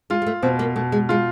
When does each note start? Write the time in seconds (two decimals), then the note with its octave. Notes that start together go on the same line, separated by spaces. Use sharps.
0.10 G#3 F4
0.22 G#3
0.26 A3
0.43 B2 C4
0.59 A#3
0.76 B2 A3
0.92 G#3
1.09 G#3 F4